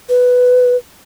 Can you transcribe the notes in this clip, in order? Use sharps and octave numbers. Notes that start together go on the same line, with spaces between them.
B4